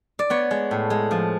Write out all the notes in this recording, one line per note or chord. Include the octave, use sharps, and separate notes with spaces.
D5
B3 C#5
G#3
A2
G#3
F3